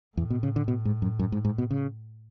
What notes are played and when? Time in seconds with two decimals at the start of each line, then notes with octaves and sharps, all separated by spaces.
0.17 E2 A2
0.30 B2
0.43 C#3
0.56 D3
0.68 B2
0.85 G#2
1.02 F#2
1.19 F#2
1.32 G#2
1.45 G#2
1.58 B2
1.71 C#3